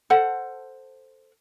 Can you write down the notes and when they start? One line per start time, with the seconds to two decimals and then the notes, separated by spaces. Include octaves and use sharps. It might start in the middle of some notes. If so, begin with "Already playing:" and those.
0.10 A4 C5 F#5